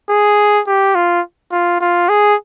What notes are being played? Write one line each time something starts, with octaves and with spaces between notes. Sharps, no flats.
G#4
G4
F4
F4
F4
G#4